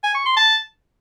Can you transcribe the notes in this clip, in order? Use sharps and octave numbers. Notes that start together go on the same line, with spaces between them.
G#5
C#6
C6
A5